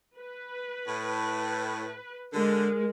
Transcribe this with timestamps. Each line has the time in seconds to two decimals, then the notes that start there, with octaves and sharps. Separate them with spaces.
0.17 B4
0.87 A2
2.33 D3 G#3 A#4